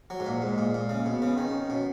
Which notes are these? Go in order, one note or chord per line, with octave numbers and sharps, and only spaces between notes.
F#3
G#2
A#2
G#2 G#3
A#2
A#2 G#3
C#3
B2 B3
C#3
D#3 C#4
B2